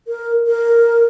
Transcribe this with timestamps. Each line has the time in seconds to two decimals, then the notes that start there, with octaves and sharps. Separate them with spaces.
0.08 A#4
0.47 A#4